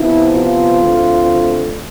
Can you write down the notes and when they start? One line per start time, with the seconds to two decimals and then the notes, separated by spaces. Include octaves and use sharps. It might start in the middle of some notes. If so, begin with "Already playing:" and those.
Already playing: C3 F3 B3 E4
0.35 F4
0.81 D2 D3 A3 C4